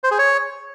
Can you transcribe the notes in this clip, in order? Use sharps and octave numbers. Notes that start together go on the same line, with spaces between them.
C5
G#4
C#5